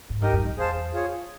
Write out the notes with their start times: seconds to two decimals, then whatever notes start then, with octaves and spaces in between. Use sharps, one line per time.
0.10 G#2
0.22 G2 D#4 G4 A#4 D#5
0.33 F#2
0.45 F2
0.57 E2 G#4 C5 F5 A5
0.93 F4 G#4 C#5